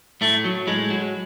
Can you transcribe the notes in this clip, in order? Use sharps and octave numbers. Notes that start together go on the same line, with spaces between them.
A2 A3
F#3
A2 G#3
F#3